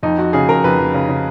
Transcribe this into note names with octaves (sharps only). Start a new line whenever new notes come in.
F2 D#4
F2 F#4
C#3 G#4
F2 A#4
F2 B4
F2
C#3
C#3